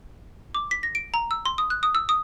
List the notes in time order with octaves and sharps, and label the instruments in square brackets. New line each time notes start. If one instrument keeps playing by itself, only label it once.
[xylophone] D6
B6
A#6
D7
A#5
E6
C6
D#6
F#6
D#6
E6
D#6